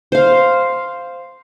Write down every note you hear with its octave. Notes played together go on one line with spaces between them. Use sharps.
C5 F5